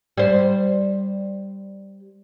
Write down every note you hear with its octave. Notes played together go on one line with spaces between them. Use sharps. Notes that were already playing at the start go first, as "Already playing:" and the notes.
G3 C5